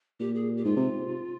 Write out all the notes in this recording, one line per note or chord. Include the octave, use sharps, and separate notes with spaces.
A#2 G4
G#4
G4
G#2 F4
C3